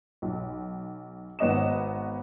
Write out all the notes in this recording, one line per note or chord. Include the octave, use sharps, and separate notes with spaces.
B1
G#1 B3 C#5 D#5 D#6 E7